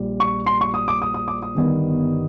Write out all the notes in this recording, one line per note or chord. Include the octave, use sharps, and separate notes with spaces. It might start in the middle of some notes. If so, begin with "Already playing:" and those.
Already playing: A#1 A#2 G3
C#6
C6
C#6
D#6
D6
D#6
D#6
D6
D#6
G1 G2 D#3 G3 B3